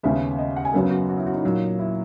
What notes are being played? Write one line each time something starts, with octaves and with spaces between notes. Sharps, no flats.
D#2 C#3 G#3 B3 E5
D#5
F#5
G#5
F#2 C#3 F#3 B3 A#4
F#4
F#4
E4
F#4
D#4
A#2 F#3 A#3
E4